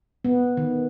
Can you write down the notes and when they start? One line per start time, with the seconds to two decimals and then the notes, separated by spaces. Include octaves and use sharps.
0.24 B3
0.57 D#3